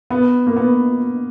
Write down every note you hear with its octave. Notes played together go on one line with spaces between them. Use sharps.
B3
A#3
B3